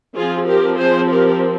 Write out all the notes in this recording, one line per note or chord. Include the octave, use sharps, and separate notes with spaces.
F3 C4 F4 G#4
G4 A#4
G#4 C5
G4 A#4